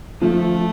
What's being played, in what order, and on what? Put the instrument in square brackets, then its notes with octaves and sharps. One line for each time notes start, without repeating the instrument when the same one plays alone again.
[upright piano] F3 [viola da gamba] A3